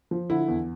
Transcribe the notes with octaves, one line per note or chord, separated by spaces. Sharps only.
F3
D3 E4
E2